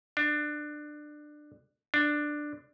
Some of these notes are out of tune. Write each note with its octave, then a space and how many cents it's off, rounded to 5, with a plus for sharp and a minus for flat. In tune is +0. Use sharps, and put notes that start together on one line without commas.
D4 +20
D4 +10